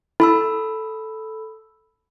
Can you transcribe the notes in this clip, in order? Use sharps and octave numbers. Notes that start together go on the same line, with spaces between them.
E4 A4 B5 E6